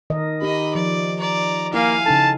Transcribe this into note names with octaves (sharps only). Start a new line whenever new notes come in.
D#3 A#4 D#5
D#4 G4 D#5 B5
F3 D5
D5 A#5
A#3 E4 F5 G#5
C#3 D#4 A4 A5